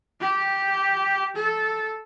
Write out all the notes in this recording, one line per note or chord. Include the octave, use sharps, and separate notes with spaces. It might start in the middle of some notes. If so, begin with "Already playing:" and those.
G4
A4